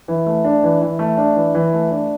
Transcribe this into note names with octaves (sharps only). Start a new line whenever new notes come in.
E3
A3
D4
E3
E3
A3
D4
E3
E3
A3
D4